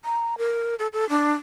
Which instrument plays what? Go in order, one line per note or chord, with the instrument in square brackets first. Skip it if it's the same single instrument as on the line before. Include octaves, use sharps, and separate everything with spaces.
[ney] A#5
A#4
A4
A4
D4